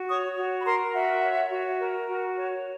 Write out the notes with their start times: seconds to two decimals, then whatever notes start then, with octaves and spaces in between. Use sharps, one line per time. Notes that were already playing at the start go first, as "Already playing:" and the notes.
Already playing: F#4
0.08 C#5 C#6 D#6
0.37 F#4
0.60 B5
0.66 A#4 A#5 C6
0.94 F#4 E5 F#5
1.22 C#5
1.50 F#4
1.79 A#4
2.08 F#4
2.36 C#5